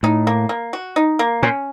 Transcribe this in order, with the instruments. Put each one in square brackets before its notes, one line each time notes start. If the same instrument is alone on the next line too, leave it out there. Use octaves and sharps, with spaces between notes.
[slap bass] A2 [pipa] D#4
[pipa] A#3
A#3
F#4
D#4
A#3
[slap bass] A#2 [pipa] C#4